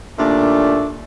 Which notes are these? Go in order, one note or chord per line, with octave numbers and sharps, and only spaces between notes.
D#2 A#2 A3 D4